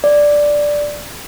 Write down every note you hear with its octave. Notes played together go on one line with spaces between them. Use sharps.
D5